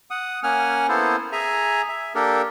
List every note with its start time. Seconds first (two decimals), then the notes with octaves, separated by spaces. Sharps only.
0.11 F#5 D#6
0.43 A#3 C#4 F#5 G#5 F6
0.88 A#3 B3 E4 A4 C5
1.32 G#4 E5 G#5 A#5
1.89 E5
2.15 A#3 D4 G4 A4 A#4